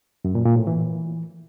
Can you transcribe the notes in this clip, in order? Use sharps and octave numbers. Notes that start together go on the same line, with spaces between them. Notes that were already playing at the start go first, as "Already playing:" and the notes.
F#2
A#2
A#2
A2
E3